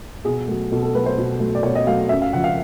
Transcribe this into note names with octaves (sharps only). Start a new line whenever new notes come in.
B2 G#4
F#3 A3
B2 A4
A4
F#3 A3 B4
C5
B2
F#3 A3
D5
B2 C#5
D#5
F#3 A3 F5
F#2 E5
F5
C#3 F3 F#5
F5